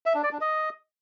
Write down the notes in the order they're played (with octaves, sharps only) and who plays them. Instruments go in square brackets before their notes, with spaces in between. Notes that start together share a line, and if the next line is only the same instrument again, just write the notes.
[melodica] E5
D4
D5
D4
D#5